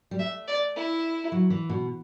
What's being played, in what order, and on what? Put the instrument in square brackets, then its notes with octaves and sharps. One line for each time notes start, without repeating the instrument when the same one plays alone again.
[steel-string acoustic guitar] G3
[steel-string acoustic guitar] A3 [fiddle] E5
[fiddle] D5
E4
[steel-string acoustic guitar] F#3
E3
B2